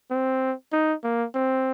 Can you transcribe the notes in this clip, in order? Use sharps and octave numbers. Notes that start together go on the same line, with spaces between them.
C4
D#4
A#3
C4